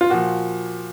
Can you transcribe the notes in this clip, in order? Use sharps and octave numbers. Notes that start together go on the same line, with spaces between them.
F4
A#2 F3 F#4